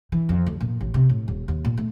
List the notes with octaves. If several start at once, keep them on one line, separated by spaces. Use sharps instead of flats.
E3
F2
D2
A#2
A1
C3
A2
D#1
D#2
A#2
A3